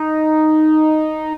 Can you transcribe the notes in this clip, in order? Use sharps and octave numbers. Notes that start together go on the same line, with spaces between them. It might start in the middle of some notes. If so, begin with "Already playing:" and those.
Already playing: D#4